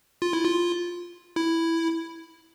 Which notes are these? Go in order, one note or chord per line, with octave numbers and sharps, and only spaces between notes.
F4
E4
F4
E4